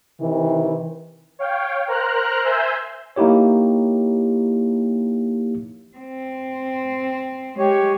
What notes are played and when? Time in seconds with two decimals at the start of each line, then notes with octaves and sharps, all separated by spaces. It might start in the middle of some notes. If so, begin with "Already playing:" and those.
0.21 C3 D#3 E3
1.39 C#5 F5 G5
1.88 A#4 C5 A#5 F6 F#6
2.43 C5 E5 G#5 E6 G6
3.16 A#3 D#4 E4 G4 C#5
5.98 C4
7.58 G#3 G4 C#5